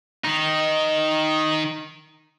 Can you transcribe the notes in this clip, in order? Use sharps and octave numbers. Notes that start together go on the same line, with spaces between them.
D#3 D#4